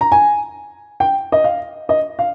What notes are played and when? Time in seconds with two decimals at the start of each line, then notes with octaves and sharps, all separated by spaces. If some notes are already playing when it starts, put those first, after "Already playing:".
0.01 A#5
0.12 G#5
1.00 G5
1.32 D#5
1.44 F5
1.89 D#5
2.19 F5